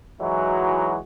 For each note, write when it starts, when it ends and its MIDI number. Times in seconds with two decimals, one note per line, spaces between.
0.21 0.97 52
0.21 0.97 54
0.21 0.97 56
0.21 0.97 63
0.21 0.97 64
0.21 0.97 66